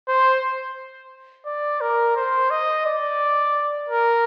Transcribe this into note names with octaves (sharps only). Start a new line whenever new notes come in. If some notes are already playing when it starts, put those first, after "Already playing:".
C5
D5
A#4
C5
D#5
D5
A#4